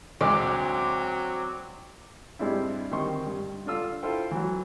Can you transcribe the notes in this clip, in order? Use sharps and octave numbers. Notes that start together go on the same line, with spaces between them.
D2 F#3 G#3 C4 D5
G2 G3 G#3 C4 D4 E4
D2 D#3 G3 C4 C6 C#6
G2
D3 D4 F4 E6
E4 F4 A4 C5 G5
E3 F#3